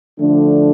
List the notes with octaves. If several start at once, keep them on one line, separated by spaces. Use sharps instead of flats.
D3 F3 A3 D4